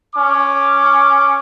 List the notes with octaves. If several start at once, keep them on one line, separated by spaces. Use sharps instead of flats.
C#4 D6